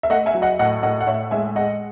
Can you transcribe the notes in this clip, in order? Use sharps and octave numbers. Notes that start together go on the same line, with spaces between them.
E5
A3 D#5 F#5
E5 G#5
F#3
D#5 F#5
A2 D#5 F#5
A2 D#5 F#5
F#5
A2 C#5 E5
G#3 E5 G#5
G#3 D#5 F#5